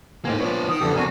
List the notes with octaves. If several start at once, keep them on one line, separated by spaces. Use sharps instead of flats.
A2 A#3 C4 D#4 G#5
A#2 F3 B3 D4 C#5
D#3 D#6
F2 D3 E3 B3 G4 A4
F2 B2 C4 D4 F#4 A#4 G#5